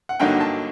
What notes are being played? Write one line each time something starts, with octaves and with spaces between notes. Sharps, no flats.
F#5
G2 D3 F#3 A#3 D#4 G5
A5